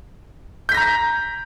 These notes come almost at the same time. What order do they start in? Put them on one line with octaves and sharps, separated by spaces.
G6 B6 A#6 A#5